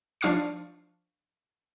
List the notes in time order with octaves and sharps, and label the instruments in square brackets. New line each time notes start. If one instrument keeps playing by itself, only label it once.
[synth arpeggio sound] F3 D4 F5 C#6 F6 C7